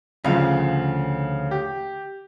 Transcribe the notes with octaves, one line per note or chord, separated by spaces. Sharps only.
D2 C#3 F3 F5
G4